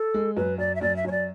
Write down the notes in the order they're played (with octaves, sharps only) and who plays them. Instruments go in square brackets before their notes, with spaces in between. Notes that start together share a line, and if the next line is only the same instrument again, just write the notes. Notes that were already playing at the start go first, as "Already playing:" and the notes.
Already playing: [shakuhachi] A4
[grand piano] G#3
[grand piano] F#2 [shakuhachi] B4
[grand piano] F#2 [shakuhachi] D5
[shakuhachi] E5
[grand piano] F#2 [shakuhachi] D5
[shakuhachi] E5
[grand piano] F#2 [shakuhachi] C#5
[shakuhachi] D5